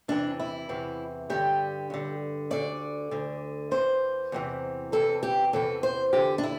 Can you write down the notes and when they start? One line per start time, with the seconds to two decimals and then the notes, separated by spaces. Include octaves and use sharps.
0.08 E2 C3 E3 D4
0.39 E4
0.69 E2 C3 E3
1.30 G2 D3 G4
1.90 G2 D3
2.50 D2 D3 D5
3.11 D2 D3
3.71 E2 C3 E3 C5
4.32 E2 C3 E3
4.92 E2 C3 E3 A4
5.23 G4
5.53 E2 C3 E3 A4
5.83 C5
6.13 E2 D3 G4
6.38 D4
6.44 E4